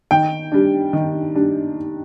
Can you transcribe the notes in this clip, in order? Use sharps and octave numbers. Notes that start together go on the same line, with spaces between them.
D#3 G5
G3 D4
D#3
G3 D4